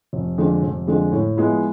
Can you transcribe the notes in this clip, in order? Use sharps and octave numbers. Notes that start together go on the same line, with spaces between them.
F1
F2 D3 G#3
F1
F2 D3 G#3
A2
F3 G#3 B3 E4